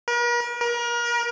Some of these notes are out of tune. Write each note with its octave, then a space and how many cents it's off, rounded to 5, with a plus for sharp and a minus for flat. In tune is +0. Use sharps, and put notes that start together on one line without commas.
A#4 +45
A#4 +35